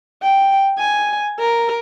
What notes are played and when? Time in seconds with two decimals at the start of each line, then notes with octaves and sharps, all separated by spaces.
0.22 G5
0.78 G#5
1.39 A#4